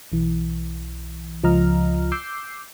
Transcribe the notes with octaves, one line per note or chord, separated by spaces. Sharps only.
B1 E3
C#2 F3 F4 D#5 A#5 F6
D6 E6 G6 C7